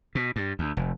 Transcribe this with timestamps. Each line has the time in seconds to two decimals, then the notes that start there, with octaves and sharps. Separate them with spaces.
0.15 B2
0.36 G2
0.59 D2
0.77 F1